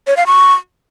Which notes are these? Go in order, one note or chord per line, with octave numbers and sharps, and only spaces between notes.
C#5
F5
C#6